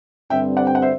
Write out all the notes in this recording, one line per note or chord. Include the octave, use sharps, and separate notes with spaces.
G2 D3 G3 C4 E5 G5
D5 F#5
G5
F#5
C5 E5